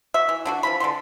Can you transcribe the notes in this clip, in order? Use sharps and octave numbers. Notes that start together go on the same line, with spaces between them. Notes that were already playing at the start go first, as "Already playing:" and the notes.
F#4 E5
E3
D3 D4 F#4
E3 F3 B5
D3 G3 G#3 C6